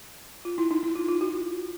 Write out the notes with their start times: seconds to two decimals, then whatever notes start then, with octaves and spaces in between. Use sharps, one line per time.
0.45 F4
0.58 E4
0.71 D#4
0.83 E4
0.95 F4
1.09 F4
1.21 F#4